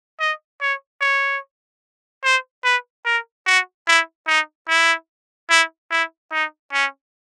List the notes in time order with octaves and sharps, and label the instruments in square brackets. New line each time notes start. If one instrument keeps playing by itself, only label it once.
[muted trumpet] D#5
C#5
C#5
C5
B4
A#4
F#4
E4
D#4
E4
E4
E4
D#4
C#4